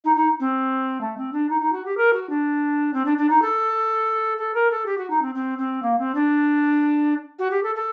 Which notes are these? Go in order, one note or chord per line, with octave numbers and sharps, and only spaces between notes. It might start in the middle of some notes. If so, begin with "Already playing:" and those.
D#4
D#4
C4
A3
C4
D4
D#4
D#4
F#4
G4
A#4
F#4
D4
C4
D4
D4
D#4
A4
A4
A#4
A4
G4
F#4
D#4
C4
C4
C4
A#3
C4
D4
F#4
G4
A4
A4